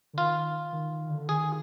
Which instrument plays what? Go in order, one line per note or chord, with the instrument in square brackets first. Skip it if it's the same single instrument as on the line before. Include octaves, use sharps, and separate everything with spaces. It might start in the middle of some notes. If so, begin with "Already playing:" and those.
[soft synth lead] D3
[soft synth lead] D#3 [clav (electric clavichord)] F4
[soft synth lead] D#3
D#3
D#3
D3
[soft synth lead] D#3 [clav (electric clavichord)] G#4